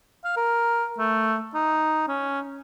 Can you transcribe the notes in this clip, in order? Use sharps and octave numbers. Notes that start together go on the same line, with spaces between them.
F5
A#4
A3
D#4
C#4